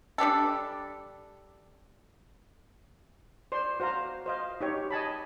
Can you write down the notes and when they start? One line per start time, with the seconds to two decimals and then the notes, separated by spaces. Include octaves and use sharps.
0.18 G3 D4 G4 A4
3.52 C5 D5 C6
3.80 F#4 C5 F5 A#5
4.26 C5 D#5 F5
4.61 D#4 G4 C#5
4.91 D#5 G#5 A5 B5